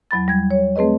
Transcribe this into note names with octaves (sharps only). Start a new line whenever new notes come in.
E2 F#3 B5 A6
G3 G#6
C#5
A3 C4 G#4 B4 D#5